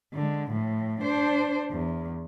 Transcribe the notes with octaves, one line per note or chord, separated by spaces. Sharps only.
D3 G#3
A2 F3
D4 C5
E2